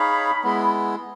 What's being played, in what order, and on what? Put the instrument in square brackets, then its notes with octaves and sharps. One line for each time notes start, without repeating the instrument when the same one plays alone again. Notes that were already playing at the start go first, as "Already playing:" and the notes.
Already playing: [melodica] D#4 G#4 C#5 F5 [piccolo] B5
[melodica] G#3 B3 E4